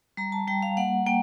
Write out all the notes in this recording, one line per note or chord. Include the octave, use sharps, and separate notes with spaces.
G3 A#5
A5
G3 G5
F5
A#3 F#5
A#3 G5